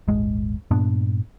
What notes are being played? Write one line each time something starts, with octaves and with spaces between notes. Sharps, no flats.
D#1 G#1 G#3
G2 A#2 B3 D4